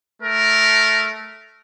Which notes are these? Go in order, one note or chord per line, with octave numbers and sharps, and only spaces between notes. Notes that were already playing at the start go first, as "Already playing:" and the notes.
A3 A#4